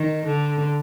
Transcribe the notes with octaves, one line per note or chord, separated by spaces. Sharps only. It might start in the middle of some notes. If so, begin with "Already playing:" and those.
Already playing: D#3
D3